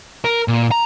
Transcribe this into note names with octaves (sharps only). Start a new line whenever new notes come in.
A#4
A#2
A#5